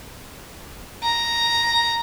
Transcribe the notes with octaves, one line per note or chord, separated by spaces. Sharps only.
A#5